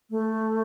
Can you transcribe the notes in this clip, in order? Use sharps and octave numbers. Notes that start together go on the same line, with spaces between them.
A3